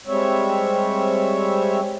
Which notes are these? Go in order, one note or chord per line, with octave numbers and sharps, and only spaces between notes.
G3 G#3 C4 C#5 E5